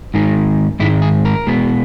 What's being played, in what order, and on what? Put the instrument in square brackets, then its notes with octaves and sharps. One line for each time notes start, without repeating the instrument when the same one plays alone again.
[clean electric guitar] G#2 D#3 G#3 D#4
G#2 D#3 G#3 E4
G#4
A#4
B2 G#3 B3